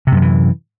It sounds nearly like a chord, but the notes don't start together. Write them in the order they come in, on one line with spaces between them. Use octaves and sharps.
C3 F#2 F3 E3